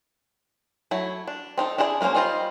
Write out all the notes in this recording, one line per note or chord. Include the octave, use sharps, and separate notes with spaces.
F#3 A3 E4
D4
C4 D#4 A4
D4 E4 G#4 C5 D5
G#3 A#3 C4 C#4 C5
G3 D#4 F4 C5 D#5